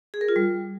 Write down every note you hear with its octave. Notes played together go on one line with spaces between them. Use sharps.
G#4
A#4
F4
G3